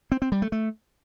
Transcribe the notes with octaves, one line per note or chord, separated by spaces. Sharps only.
C4
C4
G3
A3
A3